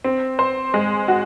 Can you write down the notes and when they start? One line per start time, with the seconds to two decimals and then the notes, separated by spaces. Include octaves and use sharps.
0.04 C4
0.39 C5
0.74 G#3
1.08 F#4